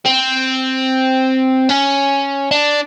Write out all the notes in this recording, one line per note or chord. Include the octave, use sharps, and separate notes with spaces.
C4
C#4
D4